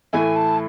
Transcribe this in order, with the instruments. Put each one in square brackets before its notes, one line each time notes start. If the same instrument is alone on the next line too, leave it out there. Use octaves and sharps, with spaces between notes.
[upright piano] A2 E3 A3 E4 [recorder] G#5
[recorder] A5